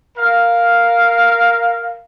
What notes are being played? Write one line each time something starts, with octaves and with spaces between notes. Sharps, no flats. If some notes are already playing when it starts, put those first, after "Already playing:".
A#4 F5